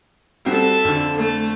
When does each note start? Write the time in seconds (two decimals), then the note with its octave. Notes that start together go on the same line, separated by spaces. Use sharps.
0.46 G3 C4 F#4 A4 E5
0.85 F2 D3
1.15 A3 A4